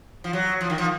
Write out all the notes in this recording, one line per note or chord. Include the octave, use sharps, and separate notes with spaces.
F3
F#3
F3
D#3
F3